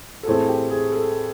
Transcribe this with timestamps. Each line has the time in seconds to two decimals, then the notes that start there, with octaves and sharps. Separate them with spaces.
0.23 A4
0.26 A2 E3 A3 C4 G#4
0.48 G4
0.71 G#4
0.92 A4